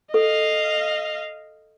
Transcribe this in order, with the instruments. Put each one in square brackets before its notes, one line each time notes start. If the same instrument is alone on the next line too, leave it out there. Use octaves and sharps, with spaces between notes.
[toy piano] A4 [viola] D#5 F5